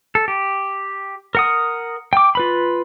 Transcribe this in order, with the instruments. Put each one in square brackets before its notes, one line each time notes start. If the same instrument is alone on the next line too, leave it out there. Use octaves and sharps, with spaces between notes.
[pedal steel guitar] A4
G4
A#4 F#5 D#6
G5 D6
F4 B4 B5